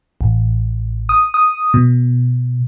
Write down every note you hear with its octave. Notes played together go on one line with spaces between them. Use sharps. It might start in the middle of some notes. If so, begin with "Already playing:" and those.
A1
D#6
D#6
B2